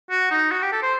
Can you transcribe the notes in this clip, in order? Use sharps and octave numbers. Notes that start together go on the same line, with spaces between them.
F#4
D#4
F#4
G4
A4
C5